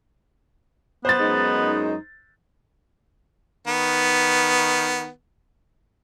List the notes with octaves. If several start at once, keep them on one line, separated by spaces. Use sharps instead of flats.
B3 C5 A6
F#2 G#3 D#4
D#3 B3